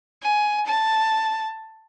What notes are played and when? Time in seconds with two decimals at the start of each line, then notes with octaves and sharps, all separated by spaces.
0.21 G#5
0.66 A5